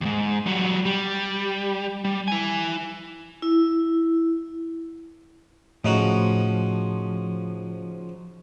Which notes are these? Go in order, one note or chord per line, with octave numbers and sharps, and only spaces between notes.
D#2 G#2
F#3 G3
G3
G3
E4 G#5
E4
A2 C#3 F3 D#4 F#4